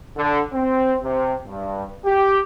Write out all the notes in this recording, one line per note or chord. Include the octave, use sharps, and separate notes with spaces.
D3
C4
C3
G2
G4